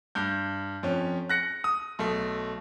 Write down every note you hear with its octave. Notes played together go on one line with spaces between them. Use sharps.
G2 G6
F2 C#4
F#6 A#6 C#7
D#6
B1 A3